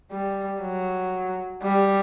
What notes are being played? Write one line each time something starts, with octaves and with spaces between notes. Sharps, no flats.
G3
F#3
G3